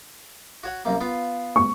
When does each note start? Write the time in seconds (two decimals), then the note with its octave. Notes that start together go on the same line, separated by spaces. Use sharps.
0.63 F#4 C#5 F#5
0.85 C2 F#2 A#3
1.01 B3 F4 F5
1.56 C#6